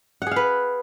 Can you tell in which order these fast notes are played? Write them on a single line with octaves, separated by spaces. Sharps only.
F#5 G#4 F5 B4